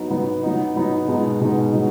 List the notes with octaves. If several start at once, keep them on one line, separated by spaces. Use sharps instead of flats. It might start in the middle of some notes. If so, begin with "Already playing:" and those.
Already playing: F#3 B3 D#4
F#3 B3 D#4
F#3 B3 D#4
F#3 B3 D#4
B2 G#3 B3 D#4
B2 G#3 B3 D#4
F#3 B3 D#4